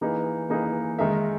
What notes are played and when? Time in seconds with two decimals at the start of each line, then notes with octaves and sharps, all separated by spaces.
0.01 E3 A#3 D#4 G#4 B4
0.49 E3 A#3 D#4 G#4 B4
0.99 D#3 G#3 D#4 A#4 E5